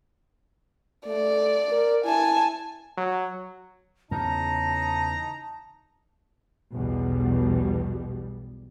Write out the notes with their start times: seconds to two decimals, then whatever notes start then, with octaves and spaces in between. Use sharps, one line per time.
1.06 A3 D5
1.72 A#4
2.05 E4 G#5 A5
2.98 F#3
4.11 E2 C#3 D#4 A5 A#5
6.72 B1 E2 B2 G3